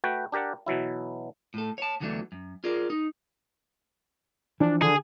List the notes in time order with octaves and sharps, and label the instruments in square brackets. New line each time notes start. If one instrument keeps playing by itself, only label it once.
[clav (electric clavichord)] A3 F#4 B4 G5
D4 G4 A#4 D5 F#5
B2 E3 F#3 E4
[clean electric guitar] A2 A4
C#5 A5
E2 D3 E3 F#3 A3 D4
F#2
F4 G#4 A#4 D5
D#4
[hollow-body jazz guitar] E3 F3 [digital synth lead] D4
[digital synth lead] D3 [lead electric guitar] G#4